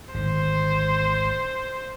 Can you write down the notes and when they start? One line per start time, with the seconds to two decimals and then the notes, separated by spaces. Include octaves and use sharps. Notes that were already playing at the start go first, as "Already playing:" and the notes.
0.14 G#1 D3 D#3 C5